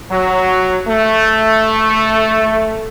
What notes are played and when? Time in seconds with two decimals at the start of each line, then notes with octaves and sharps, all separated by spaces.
0.10 F#3
0.88 A3